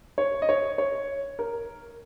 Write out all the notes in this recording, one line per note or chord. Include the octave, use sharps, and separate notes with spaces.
C#5
D#5
C#5
C#5
A#4